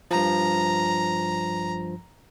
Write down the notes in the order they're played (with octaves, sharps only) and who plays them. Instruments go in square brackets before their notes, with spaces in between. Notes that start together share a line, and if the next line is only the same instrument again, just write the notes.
[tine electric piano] G2 F3 [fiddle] A#5